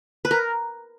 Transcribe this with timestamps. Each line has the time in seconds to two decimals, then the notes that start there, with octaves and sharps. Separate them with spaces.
0.25 B4
0.31 A#4